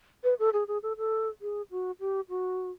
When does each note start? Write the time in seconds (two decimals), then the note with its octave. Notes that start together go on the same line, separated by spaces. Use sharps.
0.24 B4
0.39 A4
0.53 G#4
0.68 G#4
0.83 A4
0.98 A4
1.41 G#4
1.71 F#4
2.00 G4
2.29 F#4